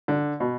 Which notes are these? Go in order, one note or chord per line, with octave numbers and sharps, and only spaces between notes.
D3
B2